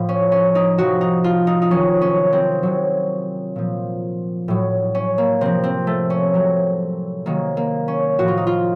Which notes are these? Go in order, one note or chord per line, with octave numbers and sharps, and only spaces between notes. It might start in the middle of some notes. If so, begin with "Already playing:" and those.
Already playing: A2 F3
C#4
C#4
D#4
C3 F3 F#4
D#4
F4
D#4
D#4
C3 D#3 F#3 C#4
C#4
C4
C3 F#3
A#2 F3
A2 F#3
C#4
A#3
C3 F3 C4
C4
A3
C#4
C3 F#3
C3 D#3 F#3 A#3
A#3
C#4
A2 F3 F#4
F4
D#4
F4